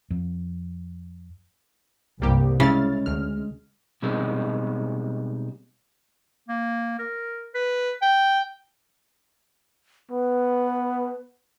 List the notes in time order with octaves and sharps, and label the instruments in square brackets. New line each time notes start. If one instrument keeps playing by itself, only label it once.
[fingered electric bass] F2
[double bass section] C2 G2 [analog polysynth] G3 A#3 G4
[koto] C#3 [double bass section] G#3 [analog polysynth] E4 F6 A6
[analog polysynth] D2 F6
[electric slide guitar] B2 G3 G#3 C4 D#4
[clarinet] A#3
A#4
B4
G5
[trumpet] B3 [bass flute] B4